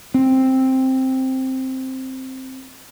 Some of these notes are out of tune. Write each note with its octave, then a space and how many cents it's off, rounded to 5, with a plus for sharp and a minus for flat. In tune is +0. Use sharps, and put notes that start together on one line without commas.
C4 +5